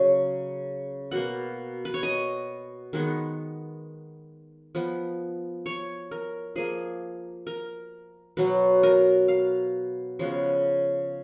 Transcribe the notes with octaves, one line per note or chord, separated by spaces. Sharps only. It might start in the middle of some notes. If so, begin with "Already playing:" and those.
Already playing: C#3 F#3 A#3
B2 A#3 F#5
B4
C#5
D#5
D#3 G#3 B3
F3 B3
C#5
A#4
F3 A#3 G#4
A#4
B2 F#3 B3 B4
A#4
F5
C#3 F3 G#3 B3